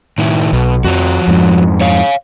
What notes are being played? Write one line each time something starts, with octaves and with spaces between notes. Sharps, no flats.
A2 D#3 E4
B1 B2
F2 F3 F#4
F2 G#2
C#5 F5